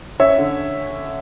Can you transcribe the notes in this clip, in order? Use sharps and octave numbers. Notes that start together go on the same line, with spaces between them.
C#4 C#5 E5
D3